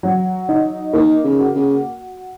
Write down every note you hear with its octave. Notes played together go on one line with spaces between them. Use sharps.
F#3
D#4
D#3 A#3
C#3
F#4
C#3